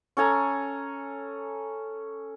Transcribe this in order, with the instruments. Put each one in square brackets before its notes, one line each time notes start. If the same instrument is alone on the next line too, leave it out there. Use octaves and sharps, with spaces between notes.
[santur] C#4 A4 G#5 A#5